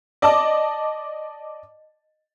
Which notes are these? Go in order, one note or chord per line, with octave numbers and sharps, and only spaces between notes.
D5 D#5 A5 D6